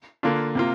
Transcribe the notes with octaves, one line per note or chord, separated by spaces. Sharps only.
D3 A#3 D4 F4
C3 A#3 F4